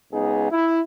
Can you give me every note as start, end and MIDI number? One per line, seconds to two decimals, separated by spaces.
0.13 0.50 37
0.13 0.50 59
0.13 0.50 63
0.13 0.50 68
0.51 0.80 64